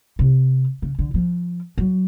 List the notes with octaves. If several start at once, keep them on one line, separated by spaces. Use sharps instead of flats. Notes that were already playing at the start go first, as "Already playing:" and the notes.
C3
C#3
D3
F3
F#3